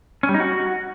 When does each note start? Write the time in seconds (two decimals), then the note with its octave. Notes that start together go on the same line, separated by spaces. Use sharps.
0.23 C#4
0.29 G3
0.34 D#4
0.40 F#4